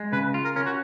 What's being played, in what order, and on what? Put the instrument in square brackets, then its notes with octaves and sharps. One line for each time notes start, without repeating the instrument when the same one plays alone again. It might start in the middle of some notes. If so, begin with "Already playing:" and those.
Already playing: [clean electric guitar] G#3
[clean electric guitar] C#3 [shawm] B4
[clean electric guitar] F4
[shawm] A#4
[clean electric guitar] C#4 [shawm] A#4
[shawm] F#4